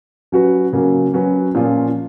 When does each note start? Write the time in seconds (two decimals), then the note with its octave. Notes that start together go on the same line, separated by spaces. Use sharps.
0.32 F#3 C#4 F#4 B4
0.73 C#3 F#3 A#3 C#4
1.14 F#3 C#4 F#4 B4
1.54 A#2 F3 A#3 C#4 F4